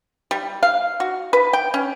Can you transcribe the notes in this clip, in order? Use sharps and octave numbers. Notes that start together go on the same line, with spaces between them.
G3
F5
F#4
B4
G5
C#4